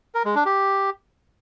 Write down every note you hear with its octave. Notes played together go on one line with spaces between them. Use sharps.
A#4
G#3
D4
G4